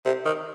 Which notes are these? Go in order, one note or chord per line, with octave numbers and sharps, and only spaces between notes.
C3
D#3